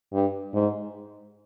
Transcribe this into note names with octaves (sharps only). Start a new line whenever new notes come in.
G2
G#2